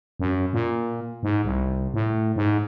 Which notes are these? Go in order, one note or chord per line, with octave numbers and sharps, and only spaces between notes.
F#2
A#2
G#2
C2
A2
G#2